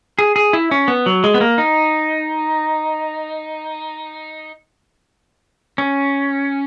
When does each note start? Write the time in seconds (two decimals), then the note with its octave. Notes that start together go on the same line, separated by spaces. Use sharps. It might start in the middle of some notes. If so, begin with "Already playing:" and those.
0.19 G#4
0.36 G#4
0.53 E4
0.71 C#4
0.88 B3
1.06 F#3
1.24 G#3
1.34 B3
1.41 A#3
1.58 D#4
5.78 C#4